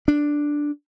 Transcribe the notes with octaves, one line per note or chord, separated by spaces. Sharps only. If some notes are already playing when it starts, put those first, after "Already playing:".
D4